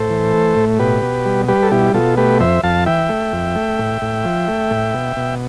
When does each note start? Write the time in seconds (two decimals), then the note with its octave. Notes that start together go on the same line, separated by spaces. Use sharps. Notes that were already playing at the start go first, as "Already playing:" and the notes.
Already playing: A2 A4 C5
0.10 E3
0.33 A3
0.56 A2
0.79 B2 G4 B4
1.02 B2
1.26 G3
1.48 G3 G4 B4
1.63 A4
1.71 B2 E4 G4
1.94 B2 F4 A4
2.17 A3 G4 B4
2.40 F2 C5 E5
2.64 F2 F5 A5
2.86 E3 E5 G5
3.09 A3
3.33 F2
3.56 A3
3.79 A2
4.02 A2
4.24 F3
4.48 A3
4.71 A2
4.94 B2
5.17 B2